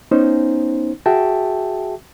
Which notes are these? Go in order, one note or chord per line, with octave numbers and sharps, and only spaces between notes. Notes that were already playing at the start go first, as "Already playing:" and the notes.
B3 C#4 D#4 C5
F#4 G#4 E5 G5 A5